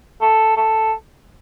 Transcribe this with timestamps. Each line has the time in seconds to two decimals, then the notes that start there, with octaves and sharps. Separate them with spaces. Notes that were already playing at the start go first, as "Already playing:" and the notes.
0.22 A4
0.57 A4